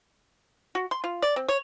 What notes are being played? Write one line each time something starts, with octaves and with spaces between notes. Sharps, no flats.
F#4
C6
F4
D5
C4
C#5